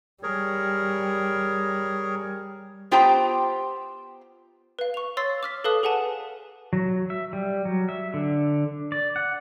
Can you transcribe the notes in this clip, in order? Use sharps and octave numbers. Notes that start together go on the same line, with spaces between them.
G3 G#4 A#4 C#5
B3 F4 G4 C5 G5 A#5
B4 F5
C#6 F7
C#5 C6 E6 A6 C7
D6 F6 B6
A4 B4 F5 A5 D#6 F#6
G#4 B4 F#5 G#5 A5
F#3
E5
G3
F#3
E5
D3
D5
F#5